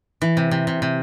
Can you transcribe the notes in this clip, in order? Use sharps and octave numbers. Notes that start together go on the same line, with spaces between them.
E3
C3
C3
C3
C3